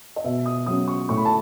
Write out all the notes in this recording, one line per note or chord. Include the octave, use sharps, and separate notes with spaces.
D#5
B2 E5
D#6
F#3 C#4 D#6
C#6
A2 C#6
B5
A5